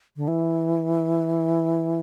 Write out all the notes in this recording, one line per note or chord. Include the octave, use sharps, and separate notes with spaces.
D3
E3